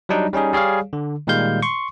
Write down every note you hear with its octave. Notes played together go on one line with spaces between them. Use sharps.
F#3 G3 D4 D#4
G3 C#4 D#4 G#4
G3 G#4 C#5 F5
D3
A#2 D#3 G3 G#3 F5 G6
C6 C#6